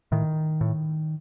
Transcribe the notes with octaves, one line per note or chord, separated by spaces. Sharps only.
A2 D#3
A2